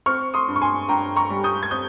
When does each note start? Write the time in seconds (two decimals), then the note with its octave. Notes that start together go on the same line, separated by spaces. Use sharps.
0.06 C4 C#6 F6
0.34 C6 D#6
0.48 G2
0.56 C#6
0.61 G#5 C6
0.89 G2 G5 A#5
1.16 A#5 C#6
1.30 G3
1.44 D#6 G6
1.63 G#6
1.71 C4 D#6 G6